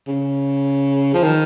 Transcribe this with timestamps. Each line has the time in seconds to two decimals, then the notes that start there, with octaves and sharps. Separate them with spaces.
0.08 C#3
1.14 F3
1.23 D#3